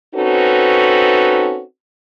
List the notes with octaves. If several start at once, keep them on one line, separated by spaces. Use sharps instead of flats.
C4 C#4 D#4 F#4 A4 B4